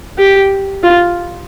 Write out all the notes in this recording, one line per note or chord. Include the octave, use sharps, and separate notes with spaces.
G4
F4